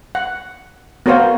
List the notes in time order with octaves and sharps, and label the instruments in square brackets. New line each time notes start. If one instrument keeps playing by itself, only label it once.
[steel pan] F#5
B3 F#4 A#4 C5 C#5 F5